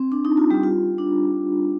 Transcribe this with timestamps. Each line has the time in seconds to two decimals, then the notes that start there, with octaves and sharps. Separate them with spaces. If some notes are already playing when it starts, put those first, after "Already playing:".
Already playing: C4
0.12 D4
0.25 D#4
0.37 F4
0.51 G3 G4
0.64 F4
0.98 D4